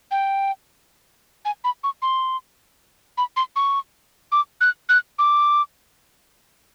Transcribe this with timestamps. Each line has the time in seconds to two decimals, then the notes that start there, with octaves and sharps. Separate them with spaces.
0.11 G5
1.45 G#5
1.64 B5
1.84 C#6
2.02 C6
3.18 B5
3.37 C6
3.56 C#6
4.32 D6
4.61 F#6
4.89 F#6
5.19 D6